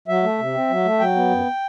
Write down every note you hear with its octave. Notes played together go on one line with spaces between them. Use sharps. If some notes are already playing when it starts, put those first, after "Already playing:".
F#3 E5
A3
C3
C4
F#3
A3
F#3 G5
B3
F#2